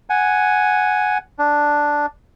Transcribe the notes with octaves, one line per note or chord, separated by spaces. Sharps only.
F#5 G#5
D4